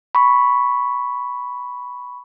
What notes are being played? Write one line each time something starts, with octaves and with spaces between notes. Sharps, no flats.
B5 C#6